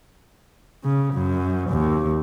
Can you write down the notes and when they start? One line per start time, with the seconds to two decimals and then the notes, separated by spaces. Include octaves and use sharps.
0.83 C#3
1.14 F#2
1.70 D#2